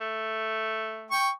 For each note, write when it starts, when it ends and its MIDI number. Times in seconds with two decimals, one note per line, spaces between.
0.01 1.16 57
1.11 1.30 79
1.11 1.30 85